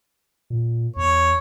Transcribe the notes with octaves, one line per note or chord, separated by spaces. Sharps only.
A#2
E2 C#5